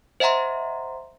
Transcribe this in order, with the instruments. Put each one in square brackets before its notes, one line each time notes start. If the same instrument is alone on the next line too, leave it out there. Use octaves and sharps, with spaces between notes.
[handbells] C5 D#5 E5 F#5 A#5 C6